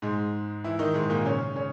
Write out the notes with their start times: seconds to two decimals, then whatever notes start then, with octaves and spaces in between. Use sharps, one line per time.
0.02 G#2 G#3
0.64 E3 E4
0.79 D#3 D#4
0.94 G#2 G#3
1.10 A#2 A#3
1.25 C#3 C#4
1.56 C#3 C#4